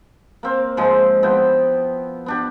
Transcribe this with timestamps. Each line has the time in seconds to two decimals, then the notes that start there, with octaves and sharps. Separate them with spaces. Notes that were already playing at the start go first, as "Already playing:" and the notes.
0.43 A#3 C4
0.77 G#2 F3 G#3 C6
1.23 F3 B3 E4 G5
2.26 B3 D4 G4